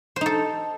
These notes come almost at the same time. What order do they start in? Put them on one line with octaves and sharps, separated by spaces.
C5 D#4 A4